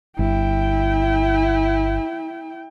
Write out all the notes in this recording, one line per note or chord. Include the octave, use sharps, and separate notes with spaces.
G1 E4 G5